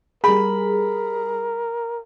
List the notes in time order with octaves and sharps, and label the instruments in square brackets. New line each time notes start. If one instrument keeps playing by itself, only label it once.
[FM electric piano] G3 G#4 [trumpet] A#4 [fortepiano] B5